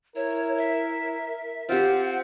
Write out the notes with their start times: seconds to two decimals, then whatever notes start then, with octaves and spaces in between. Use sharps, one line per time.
0.16 E4 A#4 C#5
0.57 E5
1.69 C4 F4 G4 F#5